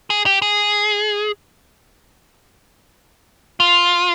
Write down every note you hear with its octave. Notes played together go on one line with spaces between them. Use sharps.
G#4
G4
G#4
F4